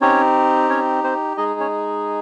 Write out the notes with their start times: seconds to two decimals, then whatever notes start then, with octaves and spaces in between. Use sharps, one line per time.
0.01 C4 C#4 D#4 G4 C#5
0.69 C#4 C#5
1.04 C4 C5
1.37 G#3 D#4 G#4 D#5
1.60 C#4 C#5